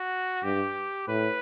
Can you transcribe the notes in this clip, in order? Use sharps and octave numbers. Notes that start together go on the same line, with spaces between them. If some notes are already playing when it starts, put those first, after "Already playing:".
Already playing: F#4
G2 G4
A2 B4